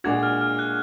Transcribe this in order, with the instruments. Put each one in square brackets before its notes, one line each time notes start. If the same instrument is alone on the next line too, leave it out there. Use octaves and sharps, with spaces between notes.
[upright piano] A#2 G#3 D4 F#4 [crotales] G#6
[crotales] F6
F6
F#6